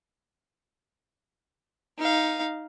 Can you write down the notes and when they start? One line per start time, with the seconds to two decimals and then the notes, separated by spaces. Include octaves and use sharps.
1.99 D#4 F5